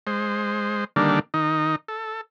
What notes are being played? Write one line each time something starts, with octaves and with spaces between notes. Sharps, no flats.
G#3 C5
D3 D#3 G3 A#3 D4
D#3 D#4
A4